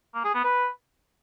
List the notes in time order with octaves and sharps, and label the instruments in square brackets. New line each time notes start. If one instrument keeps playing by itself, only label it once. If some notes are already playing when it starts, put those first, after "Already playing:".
[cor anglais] A#3
G#4
B3
B4